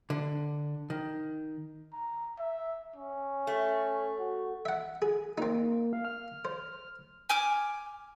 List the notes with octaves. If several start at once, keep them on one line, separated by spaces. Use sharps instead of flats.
D3
D#3
A#5
E5
C#4
A3
F#4
E5 F#5
G#4
A#3 C4 D#4
F5
F6
C5
G#5 D6 F6